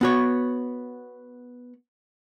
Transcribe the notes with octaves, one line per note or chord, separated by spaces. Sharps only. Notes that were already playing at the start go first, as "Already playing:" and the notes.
B3 F#4 C#5